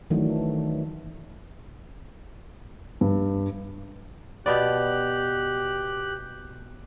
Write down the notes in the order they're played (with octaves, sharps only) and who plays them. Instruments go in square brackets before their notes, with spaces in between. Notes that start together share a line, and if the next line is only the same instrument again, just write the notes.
[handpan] D#3 E3 F#3 A3 D4
[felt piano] G2
[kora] B2 B3 D5 [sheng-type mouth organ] G4 F#6